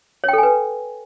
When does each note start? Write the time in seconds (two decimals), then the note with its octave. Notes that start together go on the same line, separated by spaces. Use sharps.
0.24 C#5
0.28 G5
0.33 A4
0.38 G#5
0.43 B4